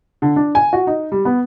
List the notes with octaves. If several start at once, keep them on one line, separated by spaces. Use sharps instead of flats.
D3
D4
G#5
F#4
D#4
G3
B3